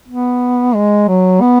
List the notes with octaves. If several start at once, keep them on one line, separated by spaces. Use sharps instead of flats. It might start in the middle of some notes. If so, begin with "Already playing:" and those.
B3
G#3
F#3
B3